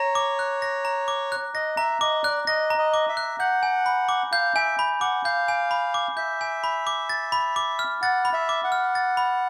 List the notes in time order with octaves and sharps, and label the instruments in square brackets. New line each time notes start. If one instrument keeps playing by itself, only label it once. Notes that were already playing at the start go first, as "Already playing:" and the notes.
Already playing: [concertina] C#5 [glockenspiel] A#5 A#6
[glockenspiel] D6
F#6
A#6
A#5
D6
F#6
[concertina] D#5 [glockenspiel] A#6
[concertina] E5 [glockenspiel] A#5
[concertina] D#5 [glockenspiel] D6
[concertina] D5 [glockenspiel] F#6
[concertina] D#5 [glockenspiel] A#6
[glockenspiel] A#5
[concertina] D#5
[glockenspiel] D6
[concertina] E5
[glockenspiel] F#6
[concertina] F#5 [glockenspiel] G6
[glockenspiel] G#5
B5
D6
[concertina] F5 [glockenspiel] G6
[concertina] E5 [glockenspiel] G#5
[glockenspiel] B5
[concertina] F#5 [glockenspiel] D6
[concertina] F5 [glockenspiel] G6
[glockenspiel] G#5
B5
D6
[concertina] E5 [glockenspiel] G6
[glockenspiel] G#5
B5
D6
A6
B5
D6
F6
[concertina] F#5 [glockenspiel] A6
[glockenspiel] B5
[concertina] E5
[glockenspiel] D6
[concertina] F#5
[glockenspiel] F6
A6
B5